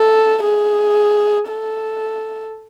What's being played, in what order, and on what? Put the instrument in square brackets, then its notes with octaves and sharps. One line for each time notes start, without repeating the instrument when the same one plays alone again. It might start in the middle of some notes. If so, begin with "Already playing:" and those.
Already playing: [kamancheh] A4
G#4
A4